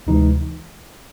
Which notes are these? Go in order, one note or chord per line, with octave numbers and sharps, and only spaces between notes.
D2 C3 E3 G#3 D#4